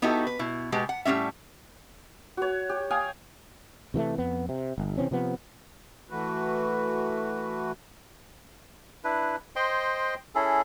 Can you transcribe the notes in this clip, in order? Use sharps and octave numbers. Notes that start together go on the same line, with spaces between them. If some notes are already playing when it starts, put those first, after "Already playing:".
B3 D#4 E4 F#4 G4 A4
B4
B2 E4
B2 G#3 B3 G4
F#5
A2 G3 G#3 C#4 E5
F#4 C#5
G4
F5 G5 G#5 D#6
C3 E3 G#3 A3
F2 B3
C3
G1
C3 E3 C4 C#4
C3 F3 B3
E3 A3 F#4 B4
D4 E4 B4
C5 D#5 G5 C6
C#4 E4 G#4 A4